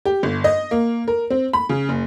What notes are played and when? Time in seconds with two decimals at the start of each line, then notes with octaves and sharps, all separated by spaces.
0.05 G4
0.23 G1
0.44 D#5
0.71 A#3
1.08 A#4
1.30 C4
1.53 B5
1.69 C#3
1.89 F#1